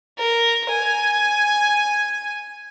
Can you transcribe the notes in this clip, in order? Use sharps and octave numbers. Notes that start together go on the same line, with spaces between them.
A#4
G#5